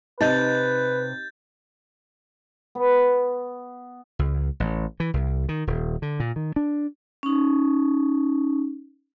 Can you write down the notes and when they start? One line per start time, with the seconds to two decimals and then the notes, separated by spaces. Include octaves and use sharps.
0.21 C3 D#4 B4 D#5 G6 A6
2.75 B3
4.19 C#2
4.60 A1
5.00 E3
5.14 C2
5.49 D#3
5.67 D#1
6.02 D3
6.20 A#2
6.36 D#3
6.56 D4
7.23 C#4 D#4